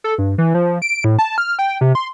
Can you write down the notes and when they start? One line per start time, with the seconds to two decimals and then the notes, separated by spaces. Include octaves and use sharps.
0.04 A4
0.18 G2
0.38 E3
0.54 F3
0.82 D7
1.04 A2
1.19 A5
1.38 F6
1.59 G5
1.81 C3
1.95 C6